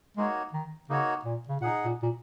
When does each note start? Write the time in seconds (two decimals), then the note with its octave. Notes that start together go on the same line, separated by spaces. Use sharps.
0.17 G#3 A#3 D#4 F#4 C#5
0.53 D#3
0.90 C#3 A#3 D#4 F#4 C#5
1.25 A#2
1.49 C#3
1.61 A#2 D#4 G#4 F#5
1.85 A#2
2.03 A#2